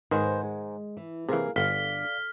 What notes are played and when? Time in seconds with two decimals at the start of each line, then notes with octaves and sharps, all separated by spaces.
0.11 G#2 D#3 B4 C5 D#5 F#5 G#5
0.44 G#3
0.97 E3
1.29 C3 E3 A#3 G#4 A#4 F5
1.56 G1 D3 D5 F5 F6 B6